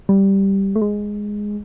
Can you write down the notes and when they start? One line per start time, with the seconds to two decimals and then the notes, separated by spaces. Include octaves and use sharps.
0.09 G3
0.76 A3
0.82 G#3